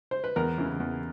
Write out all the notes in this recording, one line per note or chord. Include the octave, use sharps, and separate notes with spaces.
C5
B4
E2 A#4
C#3 E3
E2